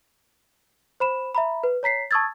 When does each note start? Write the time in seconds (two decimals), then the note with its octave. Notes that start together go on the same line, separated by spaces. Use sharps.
1.00 C5 B5 E7
1.35 E5 A#5 B5
1.63 B4
1.83 C#5 A#5 B6 C7
2.11 A5 C#6 D#6 E6 G#6 A6